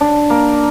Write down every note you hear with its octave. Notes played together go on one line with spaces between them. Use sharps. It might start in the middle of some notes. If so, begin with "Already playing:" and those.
D4
A#3